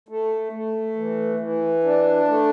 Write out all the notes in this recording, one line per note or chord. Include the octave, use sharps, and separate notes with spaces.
A3
A3
E3
E3
D4
A3